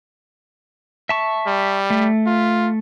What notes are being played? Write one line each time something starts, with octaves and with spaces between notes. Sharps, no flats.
E5 A5 C#6
G3
A3
F4